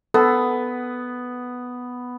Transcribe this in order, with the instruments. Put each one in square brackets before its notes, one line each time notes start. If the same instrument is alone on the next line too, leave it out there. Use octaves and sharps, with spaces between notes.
[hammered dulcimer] B3 [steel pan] A4